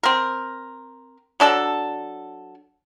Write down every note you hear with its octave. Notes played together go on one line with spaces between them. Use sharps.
C4 A#4
F#3 D4 A4 A5